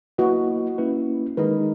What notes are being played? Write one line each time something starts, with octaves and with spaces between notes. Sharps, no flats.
A#3 E4 F#4 B4 D#5
A#3 C#4 E4 B4
D#3 G#3 D#4 A#4 B4 D#5